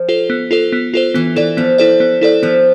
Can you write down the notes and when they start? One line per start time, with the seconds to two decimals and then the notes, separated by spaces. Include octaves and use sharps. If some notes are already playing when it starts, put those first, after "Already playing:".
Already playing: F3
0.09 F4 A4 C5
0.30 B3
0.51 F4 A4 C5
0.72 B3
0.94 F4 A4 C5
1.14 E3 B3
1.36 E3 E4 A4 D5
1.57 F3 B3
1.78 E4 A4 D5
2.00 B3
2.21 E4 A4 D5
2.43 F3 B3